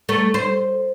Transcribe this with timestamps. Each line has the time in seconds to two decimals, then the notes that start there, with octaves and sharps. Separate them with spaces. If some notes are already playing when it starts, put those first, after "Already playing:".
0.09 A3
0.34 C5